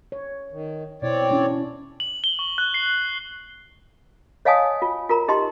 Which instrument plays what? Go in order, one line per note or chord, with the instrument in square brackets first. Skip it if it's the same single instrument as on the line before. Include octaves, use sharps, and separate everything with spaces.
[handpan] C#5
[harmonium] D#3
[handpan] B2 E4 [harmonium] C4 C#5 D5
[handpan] C#4 D4 E4
[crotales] F#7
G7
C#6
F#6
C7
[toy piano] C#5 D#5 F5 G#5 A5 D#6
F4
F4 A#4 A#5
D#4 G4 D#5 A5 C6